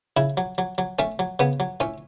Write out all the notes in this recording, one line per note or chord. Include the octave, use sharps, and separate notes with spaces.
C#3 E4
F#3
F#3
F#3
A3 C#4
F#3
C#3 B3
F#3
A2 C#4